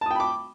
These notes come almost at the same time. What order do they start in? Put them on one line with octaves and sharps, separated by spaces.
A5 D#6 G5 B5 D6